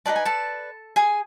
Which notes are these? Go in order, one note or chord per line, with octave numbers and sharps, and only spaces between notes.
D#4 G#4 B4 D5 A5
G#5
A4 A5
G#4 G#5